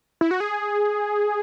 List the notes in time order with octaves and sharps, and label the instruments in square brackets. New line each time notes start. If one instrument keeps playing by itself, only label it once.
[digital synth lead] E4
F#4
G#4